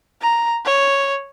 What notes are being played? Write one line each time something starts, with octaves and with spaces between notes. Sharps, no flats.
A#5
C#5